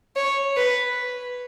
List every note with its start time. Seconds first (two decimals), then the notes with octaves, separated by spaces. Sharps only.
0.16 C#5
0.57 B4